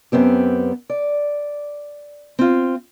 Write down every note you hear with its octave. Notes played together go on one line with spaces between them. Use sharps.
F#2 B3 C4 G4
D5
C4 F4